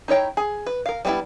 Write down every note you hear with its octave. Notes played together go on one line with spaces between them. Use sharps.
D#4 E4 C#5 G5
G#4
B4
A#4 F5
G3 B3 C#4 D4 E4